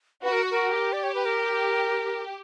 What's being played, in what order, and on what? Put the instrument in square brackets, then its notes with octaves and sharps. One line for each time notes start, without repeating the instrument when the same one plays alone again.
[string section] F#4 [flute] B4
[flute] A#4
A#4
[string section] G4
[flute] D5
C#5
B4
A#4